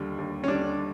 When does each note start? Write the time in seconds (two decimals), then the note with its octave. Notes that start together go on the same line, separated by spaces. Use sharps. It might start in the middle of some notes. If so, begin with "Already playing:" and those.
Already playing: D#2 D3 G3
0.18 D#2
0.44 C#4
0.48 D3 G3 D4